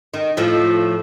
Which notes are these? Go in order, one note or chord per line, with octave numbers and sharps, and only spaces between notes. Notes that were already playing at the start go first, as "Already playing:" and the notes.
D#3
A2 F3